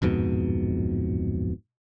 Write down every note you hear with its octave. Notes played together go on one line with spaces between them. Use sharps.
D1 F2 G#2 B2